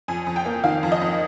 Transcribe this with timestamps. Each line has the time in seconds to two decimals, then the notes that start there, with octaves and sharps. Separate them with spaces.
0.08 F2 G#5
0.27 F2
0.36 G5
0.46 A#3
0.64 D#3 F5
0.83 F2
0.92 D#5
1.01 F2